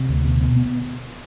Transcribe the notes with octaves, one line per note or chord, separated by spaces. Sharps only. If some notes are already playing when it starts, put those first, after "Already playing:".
Already playing: C3
D2
B2
B2
B3